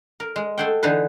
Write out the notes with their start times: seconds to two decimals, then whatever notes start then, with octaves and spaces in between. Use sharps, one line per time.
0.20 A#4
0.36 G#3
0.58 A3 G#4 A4 F#5 G5
0.83 D3 E3 D#4 G#4 B4